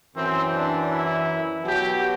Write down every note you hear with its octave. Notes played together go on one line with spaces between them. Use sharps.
F#2 E3 C4
D4
E4
B2 F#3 G4